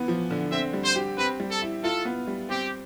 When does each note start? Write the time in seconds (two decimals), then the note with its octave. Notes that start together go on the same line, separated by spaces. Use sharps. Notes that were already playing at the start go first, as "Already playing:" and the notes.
Already playing: E3 B3
0.08 F3
0.30 D3
0.52 C4 E5
0.73 G3
0.85 C5
0.95 G4
1.18 C4 B4
1.40 G3
1.51 A4
1.62 E4
1.84 F4 A4
2.05 B3
2.27 G3
2.49 C4 G4